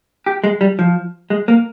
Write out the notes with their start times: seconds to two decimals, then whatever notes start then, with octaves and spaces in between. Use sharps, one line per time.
0.26 G4
0.44 G#3
0.61 G3
0.79 F3
1.30 G#3
1.48 A#3